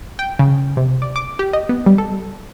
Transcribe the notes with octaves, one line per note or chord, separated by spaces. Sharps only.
G5
C#3
C3
D5
D6
G4
D#5
B3
G3
A4